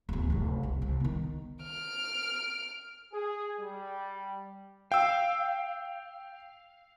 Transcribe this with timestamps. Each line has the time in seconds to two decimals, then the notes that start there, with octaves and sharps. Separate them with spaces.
0.09 D1 E2
0.30 F1 F#2
0.63 C2
0.82 C2
1.00 D#3 B3
1.63 F6 D7
3.13 G#4
3.59 G3
4.92 F5 G5 E6